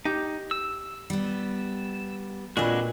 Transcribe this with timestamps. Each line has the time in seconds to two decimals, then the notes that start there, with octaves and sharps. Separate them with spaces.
0.05 D#4 G4
0.51 E6
1.10 G3 B3
2.57 A#2 G#3 C4 D4 F#4 B4 D#5